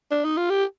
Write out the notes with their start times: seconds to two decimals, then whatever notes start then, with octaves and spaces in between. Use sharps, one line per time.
0.11 D4
0.24 D#4
0.37 F4
0.50 G4